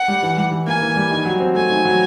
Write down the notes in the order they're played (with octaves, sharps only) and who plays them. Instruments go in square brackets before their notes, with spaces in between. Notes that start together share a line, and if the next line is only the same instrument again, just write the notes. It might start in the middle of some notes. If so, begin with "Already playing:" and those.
Already playing: [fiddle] F#5
[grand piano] G3
E3
G3
E3
[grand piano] A#3 [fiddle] G#5
[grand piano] E3
G3
D#3
F#3
C4
[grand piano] A3 [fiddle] G#5
[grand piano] D#3
F#3